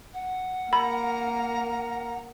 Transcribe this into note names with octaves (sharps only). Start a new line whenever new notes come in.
F#5
A#3 A#4 A#5 B5